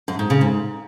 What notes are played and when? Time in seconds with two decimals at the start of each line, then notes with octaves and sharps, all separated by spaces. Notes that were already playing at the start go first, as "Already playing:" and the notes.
0.08 F#2
0.19 G#2
0.30 C#3
0.41 G#2